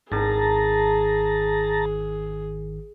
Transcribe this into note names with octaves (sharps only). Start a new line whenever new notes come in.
G#1 D#3 G#4 A5 A#5